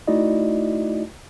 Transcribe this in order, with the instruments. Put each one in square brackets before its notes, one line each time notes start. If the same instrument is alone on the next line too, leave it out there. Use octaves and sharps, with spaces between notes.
[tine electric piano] A3 D#4 E4 F#4 D5 D#5